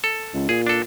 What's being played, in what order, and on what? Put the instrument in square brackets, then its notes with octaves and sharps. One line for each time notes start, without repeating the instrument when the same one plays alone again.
[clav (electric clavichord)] A4
[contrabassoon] C#2
[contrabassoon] A#2 [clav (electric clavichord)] G#4
[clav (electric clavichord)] D4 A4